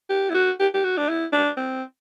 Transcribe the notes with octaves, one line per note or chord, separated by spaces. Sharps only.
G4
E4
F#4
G4
G4
F#4
D4
E4
D4
C4